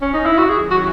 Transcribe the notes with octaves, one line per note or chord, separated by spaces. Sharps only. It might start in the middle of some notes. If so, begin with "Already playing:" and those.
C#4
D#4
E4
F#4
D#3 F#3 C#4 E4 G#4
F#4